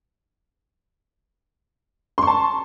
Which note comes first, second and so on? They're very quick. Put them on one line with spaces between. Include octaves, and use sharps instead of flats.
C6 C#6 A5